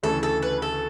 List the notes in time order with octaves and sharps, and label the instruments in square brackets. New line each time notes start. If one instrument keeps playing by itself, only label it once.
[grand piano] D2 C#3 E3 A3 [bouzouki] A4
[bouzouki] A4
B4
A4